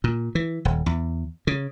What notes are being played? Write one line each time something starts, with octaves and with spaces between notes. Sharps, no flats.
A#2
E3
D#1
E2
C#3